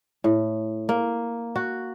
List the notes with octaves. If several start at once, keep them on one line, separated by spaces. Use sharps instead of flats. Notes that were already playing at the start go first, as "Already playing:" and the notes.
A2
A#3
F#4